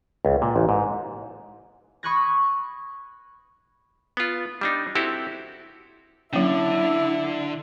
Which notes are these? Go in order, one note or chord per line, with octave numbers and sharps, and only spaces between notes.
C#2
A#2
A1
G#2
B5 C#6 D#6 F#6 G#6 A#6
B3 F4
G3 D4 D#4
C4 E4 F#4 G4 A4
D3 F#3 A#3 C#4 E4